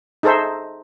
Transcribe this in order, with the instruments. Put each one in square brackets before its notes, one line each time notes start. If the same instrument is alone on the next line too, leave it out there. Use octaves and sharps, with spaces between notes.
[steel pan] D#4 G#4 A4 C5 E5